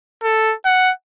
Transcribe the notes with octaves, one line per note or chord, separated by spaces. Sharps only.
A4
F#5